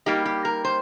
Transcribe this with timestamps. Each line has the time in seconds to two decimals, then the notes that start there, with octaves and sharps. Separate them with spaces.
0.06 G3 A#3 D#4 G4
0.25 G4
0.45 A#4
0.65 C5